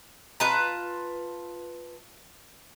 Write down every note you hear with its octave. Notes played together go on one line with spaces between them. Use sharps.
F4 B4 A5 A#5